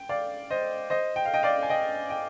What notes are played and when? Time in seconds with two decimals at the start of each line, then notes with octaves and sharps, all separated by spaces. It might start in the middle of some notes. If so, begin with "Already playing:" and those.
Already playing: G5
0.09 D5 F5
0.50 C5 D#5
0.90 C5 D#5
1.16 G5
1.25 F5
1.34 D#5 G5
1.43 D5 F5
1.63 G#5
1.69 D#5 G5
2.10 D#5 G5